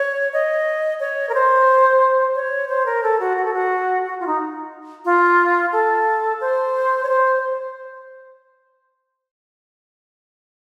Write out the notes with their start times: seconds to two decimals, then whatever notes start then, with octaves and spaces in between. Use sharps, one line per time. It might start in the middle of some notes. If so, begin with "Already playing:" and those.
Already playing: C#5
0.33 D#5
1.00 C#5
1.29 A#4
1.34 C5
2.35 C#5
2.68 C5
2.86 A#4
3.03 A4
3.20 F#4
3.37 F#4
3.45 A4
3.53 F#4
4.04 F#4
4.20 F4
4.27 D#4
5.05 F4
5.72 A4
6.41 C5
7.03 C#5
7.08 C5